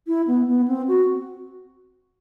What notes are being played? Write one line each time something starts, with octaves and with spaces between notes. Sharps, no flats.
E4
B3
B3
C4
F#4